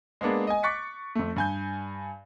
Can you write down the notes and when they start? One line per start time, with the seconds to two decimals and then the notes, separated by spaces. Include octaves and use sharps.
0.21 G#3 A#3 B3 D4 G#4
0.47 D#5 G#5
0.63 C#6 D6 F#6 A6 B6 C#7
1.15 F2 A3
1.36 G2 G#5 G6